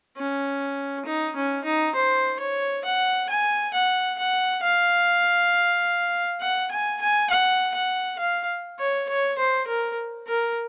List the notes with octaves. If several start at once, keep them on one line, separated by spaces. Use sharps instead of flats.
C#4
D#4
C#4
D#4
C5
C#5
F#5
G#5
F#5
F#5
F5
F#5
G#5
G#5
F#5
F#5
F5
C#5
C#5
C5
A#4
A#4